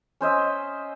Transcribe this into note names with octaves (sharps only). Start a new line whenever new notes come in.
C#4 C5 D#5 E5